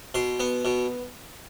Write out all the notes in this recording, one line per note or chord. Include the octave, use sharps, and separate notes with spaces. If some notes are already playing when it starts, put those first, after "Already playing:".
B2 C6
B3
B2